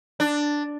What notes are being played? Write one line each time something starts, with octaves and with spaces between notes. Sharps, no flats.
D4